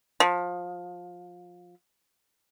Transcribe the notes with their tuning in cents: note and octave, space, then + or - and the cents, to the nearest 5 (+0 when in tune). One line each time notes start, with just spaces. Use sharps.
F3 +20